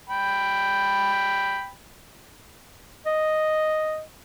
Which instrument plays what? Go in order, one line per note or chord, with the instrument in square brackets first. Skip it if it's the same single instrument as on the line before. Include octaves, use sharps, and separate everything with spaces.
[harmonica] G5 B5
[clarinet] D#5